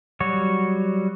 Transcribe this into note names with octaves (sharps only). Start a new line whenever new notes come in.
F#3 G3 F#4 C#5